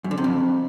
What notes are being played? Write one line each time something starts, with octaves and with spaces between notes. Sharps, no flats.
F#2
D3
C3
F2